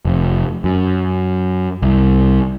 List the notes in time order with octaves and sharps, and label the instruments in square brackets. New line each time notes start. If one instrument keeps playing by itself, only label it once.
[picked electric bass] F1
F#2
C2